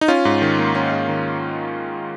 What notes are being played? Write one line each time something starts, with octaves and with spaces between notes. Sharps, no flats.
D#4
C#4 F4
G#2
D#3
A#3
C#4
G#2
D#3